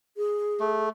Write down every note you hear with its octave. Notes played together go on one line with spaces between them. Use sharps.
G#4
A3